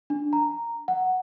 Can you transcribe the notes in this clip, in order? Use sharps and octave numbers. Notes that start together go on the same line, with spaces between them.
D4
A#5
F#5